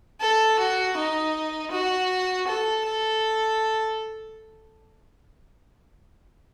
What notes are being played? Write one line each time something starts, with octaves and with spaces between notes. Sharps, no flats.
A4
F#4
D#4
F#4
A4
A4